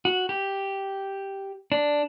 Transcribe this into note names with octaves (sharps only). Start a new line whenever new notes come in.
F#4
G4
D4